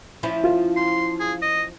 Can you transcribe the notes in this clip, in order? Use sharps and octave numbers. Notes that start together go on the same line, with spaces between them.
F3 C#4 E4
F4
C6
G#4
D#5